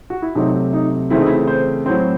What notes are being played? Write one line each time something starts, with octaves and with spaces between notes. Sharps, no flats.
F#4
E4
C3 F#3 A3 C4 D#4
D#4
C#3 E3 A3 C4 E4
D#4
E4
C5
A2 F#3 C4 C5